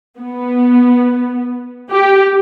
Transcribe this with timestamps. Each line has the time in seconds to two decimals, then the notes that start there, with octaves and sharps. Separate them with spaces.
0.20 B3
1.91 G4